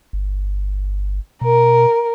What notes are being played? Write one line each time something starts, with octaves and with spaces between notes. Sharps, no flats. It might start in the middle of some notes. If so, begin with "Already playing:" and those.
G1
B2 A#4